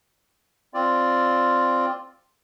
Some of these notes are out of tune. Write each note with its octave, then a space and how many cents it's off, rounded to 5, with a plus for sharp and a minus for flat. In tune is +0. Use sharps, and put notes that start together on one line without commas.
C4 +0 F4 +0 D5 +0